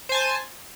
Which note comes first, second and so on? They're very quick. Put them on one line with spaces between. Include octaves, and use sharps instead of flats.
C5 G#5 A5